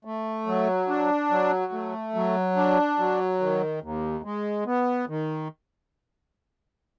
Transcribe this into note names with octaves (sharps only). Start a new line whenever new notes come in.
A3
F#3
D4
F#3
A3
F#3
D4
F#3
D#3
D#2
G#3
B3
D#3